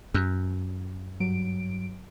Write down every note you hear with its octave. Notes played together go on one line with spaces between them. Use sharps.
F#2
G2 F#3 D7